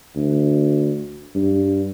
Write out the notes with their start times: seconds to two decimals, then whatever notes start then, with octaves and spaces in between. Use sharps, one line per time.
0.16 D2
1.35 G2